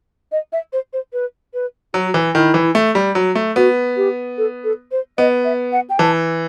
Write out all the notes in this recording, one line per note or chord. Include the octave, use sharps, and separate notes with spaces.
D#5
E5
C5
C5
B4
B4
F#3 F#4
E3
D#3 E4
E3
A3
G3
F#3
A3
B3 F#4
G4
A4
A4
C5
B3 D#5
E5
F#5
G5
E3 A5